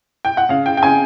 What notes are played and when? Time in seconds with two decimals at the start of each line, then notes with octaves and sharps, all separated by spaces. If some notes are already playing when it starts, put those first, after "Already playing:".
0.25 G5
0.37 F#5
0.49 C#3 F5
0.66 G5
0.77 G5
0.82 C#3 G#5